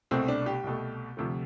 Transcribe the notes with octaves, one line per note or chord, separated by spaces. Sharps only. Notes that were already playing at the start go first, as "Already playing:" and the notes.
C2 B2 A3 C4
D4
G4
C2 B2 A3
D2 C3 F3 A3